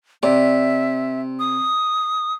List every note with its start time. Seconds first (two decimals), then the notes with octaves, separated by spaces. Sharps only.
0.23 C3 D5 E5
1.39 D#6